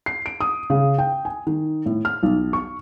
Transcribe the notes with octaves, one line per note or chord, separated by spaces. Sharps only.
C7
D7
D#6
C#3
G5
G#5
D#3
A2
F6
B1
C#6